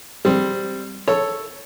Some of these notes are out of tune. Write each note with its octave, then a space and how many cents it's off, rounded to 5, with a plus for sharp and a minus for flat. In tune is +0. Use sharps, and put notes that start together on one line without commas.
G3 +0 C4 +0
A4 +0 C#5 +0